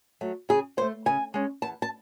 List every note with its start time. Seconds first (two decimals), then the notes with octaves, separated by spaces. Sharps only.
0.21 F#3 A3
0.49 C#3 G#4
0.77 F#3 C5
0.81 A3
1.06 C#3 G#5
1.34 G#3 C#4
1.62 E2 A5
1.82 A5